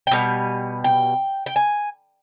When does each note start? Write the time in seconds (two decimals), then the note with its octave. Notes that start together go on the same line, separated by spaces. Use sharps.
0.07 G5
0.11 B2 G3 G#5
0.84 G5
1.46 G5
1.56 G#5